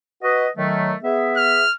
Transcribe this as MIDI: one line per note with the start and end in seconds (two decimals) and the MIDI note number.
0.22 0.47 66
0.22 0.47 71
0.22 0.47 75
0.57 0.93 51
0.57 0.93 54
0.57 0.93 57
1.03 1.63 59
1.03 1.63 68
1.03 1.63 76
1.37 1.74 89